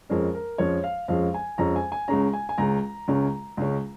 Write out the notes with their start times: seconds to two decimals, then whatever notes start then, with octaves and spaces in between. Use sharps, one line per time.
0.09 F2 F3 G#3 C#4 A#4
0.34 A#4
0.58 F2 F3 G#3 C#4 C#5
0.84 F5
1.08 F2 F3 G#3 C#4 F5
1.34 G#5
1.58 F2 F3 G#3 C#4 A#5
1.76 G#5
1.92 G#5
2.08 C#2 C#3 G#3 C#4 A#5
2.33 G#5
2.49 G#5
2.58 C#2 C#3 G#3 C#4 A#5
3.08 C#2 C#3 G#3 C#4
3.57 C#2 C#3 G#3 C#4